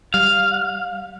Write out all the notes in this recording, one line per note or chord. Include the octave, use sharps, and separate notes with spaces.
G3 F5